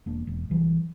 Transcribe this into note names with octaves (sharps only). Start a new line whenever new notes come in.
E1 A#3 D4
E1
C2 E3 F#3